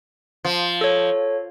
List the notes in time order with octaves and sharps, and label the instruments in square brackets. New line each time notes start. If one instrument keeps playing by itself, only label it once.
[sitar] F3
[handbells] A4 C#5